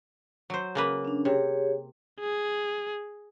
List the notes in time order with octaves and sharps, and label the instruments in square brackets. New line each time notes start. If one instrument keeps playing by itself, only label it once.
[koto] F#3 C5
C#3 A#3 B4
[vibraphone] C#4 D4
[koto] C3 [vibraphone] G4 G#4 C#5
[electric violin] G#4